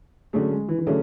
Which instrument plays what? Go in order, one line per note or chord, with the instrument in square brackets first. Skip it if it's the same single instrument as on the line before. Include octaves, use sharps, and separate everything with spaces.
[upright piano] D3 F#3 C#4 G#4 [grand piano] A3
[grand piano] G#3
E3
E3
[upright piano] D3 A3 C#4 G#4 [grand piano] F#3